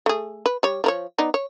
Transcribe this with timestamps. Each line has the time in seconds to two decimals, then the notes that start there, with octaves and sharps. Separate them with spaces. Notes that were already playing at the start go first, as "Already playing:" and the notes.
0.06 A3 G#4
0.46 B4
0.63 G3 C#5
0.84 F3 A#4 C#5
1.18 B3 D#4 D5
1.34 C#5